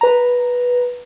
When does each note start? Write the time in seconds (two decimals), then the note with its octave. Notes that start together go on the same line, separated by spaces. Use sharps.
0.01 B4 A#5